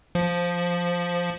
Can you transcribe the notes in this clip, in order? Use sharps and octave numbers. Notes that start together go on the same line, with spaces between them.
F3